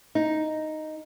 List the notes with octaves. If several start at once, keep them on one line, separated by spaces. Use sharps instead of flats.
D#4